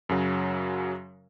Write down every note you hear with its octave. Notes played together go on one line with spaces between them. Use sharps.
F#2 C#3 F#3